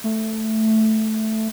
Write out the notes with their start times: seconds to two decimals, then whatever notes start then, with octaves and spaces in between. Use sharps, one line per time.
0.04 A3